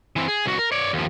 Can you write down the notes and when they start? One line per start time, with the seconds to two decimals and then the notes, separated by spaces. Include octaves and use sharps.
0.16 E3 C4
0.28 G#4
0.46 C2 F#4
0.59 A#4
0.72 C#5 D5
0.93 D#2 F3